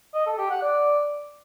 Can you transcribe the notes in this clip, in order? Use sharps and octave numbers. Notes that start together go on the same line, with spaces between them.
D#5
A4
G4
F#5
D5